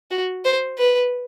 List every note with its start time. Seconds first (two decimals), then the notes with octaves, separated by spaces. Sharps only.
0.11 F#4
0.45 C5
0.78 B4